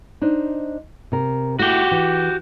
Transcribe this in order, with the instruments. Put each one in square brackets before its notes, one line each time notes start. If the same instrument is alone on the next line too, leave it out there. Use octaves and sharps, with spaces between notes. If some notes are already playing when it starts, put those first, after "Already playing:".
[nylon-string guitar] D4 D#4 C5
C3 A#4
[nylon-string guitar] A3 E4 [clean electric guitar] F#4 G4
[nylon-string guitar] E3